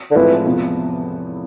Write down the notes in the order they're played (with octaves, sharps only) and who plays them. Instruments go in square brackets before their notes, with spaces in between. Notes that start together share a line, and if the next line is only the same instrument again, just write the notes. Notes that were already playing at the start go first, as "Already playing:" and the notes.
[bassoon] D3
[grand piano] A2 F3 G#3 C4 F4 [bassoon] E3
[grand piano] E2 C3 F3 B3